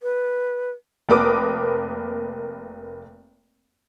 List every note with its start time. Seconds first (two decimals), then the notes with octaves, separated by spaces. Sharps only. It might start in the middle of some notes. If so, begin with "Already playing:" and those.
0.03 B4
1.09 F1 A#3 A#4 B4 D6 D#6